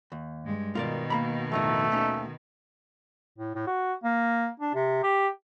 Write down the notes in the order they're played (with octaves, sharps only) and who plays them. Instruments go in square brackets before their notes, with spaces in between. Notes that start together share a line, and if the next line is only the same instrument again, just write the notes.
[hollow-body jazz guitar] D#2
[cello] G2 G#3
[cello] B2 D#3 [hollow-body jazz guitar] F4 A#4 D5
[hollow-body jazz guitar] A#3 A#5 B5
[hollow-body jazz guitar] F2 A2 D#4 [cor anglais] A3
[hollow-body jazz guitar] D#2 C#4 D#4
[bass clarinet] A2
A2
F#4
A#3
D4
C3
G4